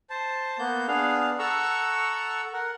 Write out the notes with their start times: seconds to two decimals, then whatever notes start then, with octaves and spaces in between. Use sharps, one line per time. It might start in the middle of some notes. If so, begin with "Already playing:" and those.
0.10 C5 A5
0.59 A#3 B3 G6
0.88 B3 D4 G#4 F5
1.39 A4 F#5 A#5 C#6 E6
2.53 A#4 F#5